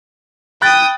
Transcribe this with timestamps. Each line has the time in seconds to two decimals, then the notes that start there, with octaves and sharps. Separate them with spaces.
0.62 G5 B5 D#6 F#6 A6